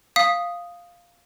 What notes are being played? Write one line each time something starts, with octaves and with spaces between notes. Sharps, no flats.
F5 D#6 B6